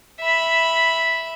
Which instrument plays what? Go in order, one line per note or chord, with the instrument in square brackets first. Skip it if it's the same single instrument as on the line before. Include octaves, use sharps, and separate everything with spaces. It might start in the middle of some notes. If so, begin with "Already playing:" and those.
[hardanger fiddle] E5 B5